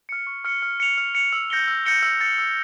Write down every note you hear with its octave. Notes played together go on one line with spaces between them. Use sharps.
F6 C#7
C#6
F6 C#7
F6
C#7 F7
F6
C#7 F7
E6
G6 A#6 C#7 G7
E6
G6 A#6 C#7 G7
E6
A6 C#7
E6